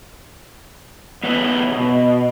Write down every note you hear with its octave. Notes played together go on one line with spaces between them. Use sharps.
B3 B4 C#5 E5
B2